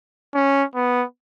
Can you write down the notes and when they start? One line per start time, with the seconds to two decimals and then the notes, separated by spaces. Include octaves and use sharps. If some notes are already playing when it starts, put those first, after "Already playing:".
0.34 C#4
0.75 B3